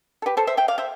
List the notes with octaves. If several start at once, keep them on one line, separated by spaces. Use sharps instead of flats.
A4
G4 B4
A4 C5
C5 E5
E5 G5
D5 F5
C5 E5